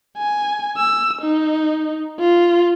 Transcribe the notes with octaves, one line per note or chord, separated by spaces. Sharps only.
G#5
E6
D#4
F4